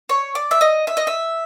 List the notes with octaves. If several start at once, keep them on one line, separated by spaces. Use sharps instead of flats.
C#5
D5
E5
D#5
E5
D#5
E5